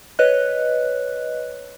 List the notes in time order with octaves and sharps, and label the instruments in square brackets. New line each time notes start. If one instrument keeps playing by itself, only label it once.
[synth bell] B4 C#5 D#5 F#6